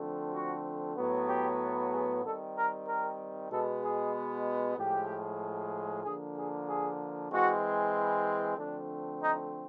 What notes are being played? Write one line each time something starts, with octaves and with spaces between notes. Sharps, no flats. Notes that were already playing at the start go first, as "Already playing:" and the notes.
Already playing: D3 F3 A3 C4
F#4
A2 F#3 B3
G4
G#4
D#3 G3 C4 A4
A#4
A#4
B2 G#3 B3 A4
G#4
A2 F3 G#3 G4
D3 F3 A#3 G#4
G#4
G#4
E3 G#3 C4 F#4
E4
D3 F3 A3 C4 D4
D#4